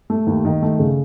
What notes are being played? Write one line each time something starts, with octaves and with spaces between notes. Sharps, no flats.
A3
D#2
D#3
A3
C#3